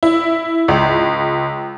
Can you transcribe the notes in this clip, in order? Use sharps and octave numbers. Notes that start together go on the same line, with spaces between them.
E4
C#2